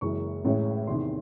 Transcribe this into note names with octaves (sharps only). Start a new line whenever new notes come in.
F#1 F#2 E3 G#3 C#6
A1 A2 G#3 C#4
E2 C3 D#3 C6